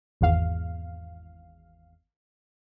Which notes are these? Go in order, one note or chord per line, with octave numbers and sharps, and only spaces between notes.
G#1 E2 F5